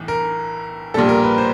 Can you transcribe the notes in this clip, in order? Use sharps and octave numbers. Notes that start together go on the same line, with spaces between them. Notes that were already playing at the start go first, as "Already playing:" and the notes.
Already playing: B1 A2 E3
A#4
A#1 A#2 G3 A4
A#4
B4
C5